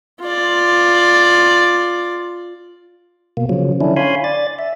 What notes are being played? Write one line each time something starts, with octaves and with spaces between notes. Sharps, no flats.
F4 D5
B2 A#3
C#3 F3 F#3
D3 C#4 D4 E4
C#5 F5 G#5 B5 C6
D5 A6
E5